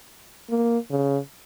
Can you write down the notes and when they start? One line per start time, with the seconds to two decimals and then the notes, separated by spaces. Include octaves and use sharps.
0.50 A#3
0.90 C#3